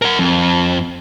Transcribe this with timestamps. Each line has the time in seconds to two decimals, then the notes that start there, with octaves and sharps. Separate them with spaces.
0.02 A#4 F#5
0.19 F2